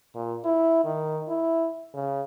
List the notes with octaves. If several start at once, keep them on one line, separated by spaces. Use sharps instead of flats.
A#2
E4
D#3
E4
C#3